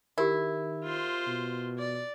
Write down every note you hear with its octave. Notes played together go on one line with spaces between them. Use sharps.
D#3 E4 G4 A#4
F4 C5
B2
D5